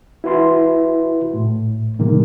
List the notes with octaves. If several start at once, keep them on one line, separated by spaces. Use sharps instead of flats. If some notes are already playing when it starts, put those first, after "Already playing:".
E4 F#4 B4 E5 C6
A2
A2 C3 D#3 G3 G#3 A#3